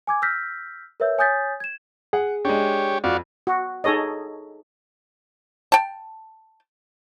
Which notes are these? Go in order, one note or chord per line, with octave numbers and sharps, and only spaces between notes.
G#5 D6 G#6
E6 F6 G6 A#6 B6
A#4 B4 C#5 E5 E6 G6
C#5 G#5 D#6 G6 A6 B6
G#6 E7
G#4 F#5
G#3 D4 G4 C#5
F2 F#4 D5 F5
F#4
D#4 G#4 A4 C#5 D#5
G5 A5